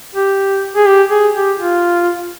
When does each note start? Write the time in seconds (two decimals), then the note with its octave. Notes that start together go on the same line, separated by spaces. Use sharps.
0.15 G4
0.75 G#4
0.87 G4
1.11 G#4
1.34 G4
1.59 F4